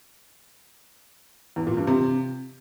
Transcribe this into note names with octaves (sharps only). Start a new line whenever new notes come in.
E2
A#2
G2
C3